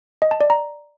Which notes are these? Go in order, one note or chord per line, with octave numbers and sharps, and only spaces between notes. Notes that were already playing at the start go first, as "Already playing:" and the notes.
D#5
A5
D5
A#5